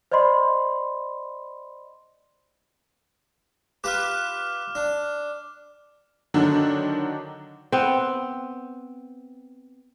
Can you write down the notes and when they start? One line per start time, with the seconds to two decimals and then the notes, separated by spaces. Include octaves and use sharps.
0.12 C5 D5 D#5 B5 C6
3.84 F4 G4 B4 D6 F6
4.75 D4
6.34 D3 D#3 F#3 D4
7.72 B3 C4